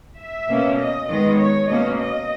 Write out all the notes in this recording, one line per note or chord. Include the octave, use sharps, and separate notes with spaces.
E5
B2 A#3 C#4
D#5
D#3 G#3 B3 D#5
C#5
B2 A#3 C#4 D#5
D#5